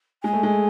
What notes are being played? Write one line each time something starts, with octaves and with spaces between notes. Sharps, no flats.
G#3 G#5
A3
G#3